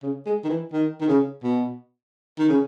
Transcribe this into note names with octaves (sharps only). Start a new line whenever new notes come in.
C#3
G#3
D#3
E3
D#3
D#3
C#3
B2
D#3
C#3